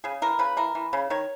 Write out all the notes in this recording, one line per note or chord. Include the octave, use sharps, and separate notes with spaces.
C#3 G#4
E3 A#4
C#3 B4
E3 A#4
E3
C#3
D#3 C#5